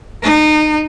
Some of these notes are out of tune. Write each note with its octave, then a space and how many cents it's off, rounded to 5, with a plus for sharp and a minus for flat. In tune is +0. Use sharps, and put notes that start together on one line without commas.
D#4 -25